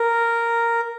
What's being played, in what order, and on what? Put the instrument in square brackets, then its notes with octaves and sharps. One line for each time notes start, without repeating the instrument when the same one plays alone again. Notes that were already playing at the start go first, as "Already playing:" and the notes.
Already playing: [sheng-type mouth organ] A#4